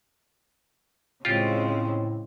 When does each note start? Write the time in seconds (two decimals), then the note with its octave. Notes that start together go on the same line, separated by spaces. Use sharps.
1.25 A2 C#3 G#3 C4 F4 G4